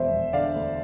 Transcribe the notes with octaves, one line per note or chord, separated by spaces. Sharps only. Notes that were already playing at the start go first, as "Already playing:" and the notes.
Already playing: E1 C5 E5
E1
D3 D5 F5
D2